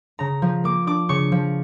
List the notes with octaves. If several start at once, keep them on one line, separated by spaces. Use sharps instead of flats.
C#3 A#5
F3
A#3 D6
D4 D6
C#3 C#6
F3